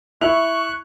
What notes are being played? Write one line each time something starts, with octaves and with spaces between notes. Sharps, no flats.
E4 C#6 F#6 F7 F#7